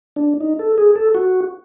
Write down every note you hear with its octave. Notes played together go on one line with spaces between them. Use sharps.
D4
D#4
A4
G#4
A4
F#4